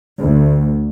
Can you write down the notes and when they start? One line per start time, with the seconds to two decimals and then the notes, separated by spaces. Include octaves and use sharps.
0.20 D2